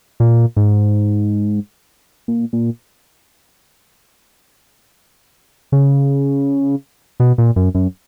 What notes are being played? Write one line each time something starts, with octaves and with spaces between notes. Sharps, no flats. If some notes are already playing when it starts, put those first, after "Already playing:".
A#2
G#2
A#2
A#2
C#3
B2
A#2
F#2
F#2